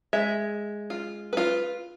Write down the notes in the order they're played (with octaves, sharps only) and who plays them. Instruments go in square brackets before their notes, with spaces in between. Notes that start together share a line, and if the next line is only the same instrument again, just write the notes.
[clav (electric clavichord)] G#3 [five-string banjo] E5
[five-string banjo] F4
F4 B4